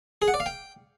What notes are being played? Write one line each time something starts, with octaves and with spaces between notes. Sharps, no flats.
G#4
F#5
D5
F5
G5